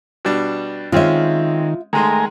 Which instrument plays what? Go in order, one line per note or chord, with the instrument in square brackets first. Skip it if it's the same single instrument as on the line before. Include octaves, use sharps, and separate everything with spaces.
[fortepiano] B2 G3 D4
[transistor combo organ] D#3 [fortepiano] G#3 C4 C#4 [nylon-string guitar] F4 E5
[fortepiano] D#3 G#3 C6 [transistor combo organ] A3 G#5 A#5